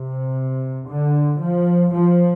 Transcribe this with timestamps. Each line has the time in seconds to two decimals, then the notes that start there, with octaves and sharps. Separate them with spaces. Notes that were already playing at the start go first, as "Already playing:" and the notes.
Already playing: C3
0.89 D3
1.41 F3
1.93 F3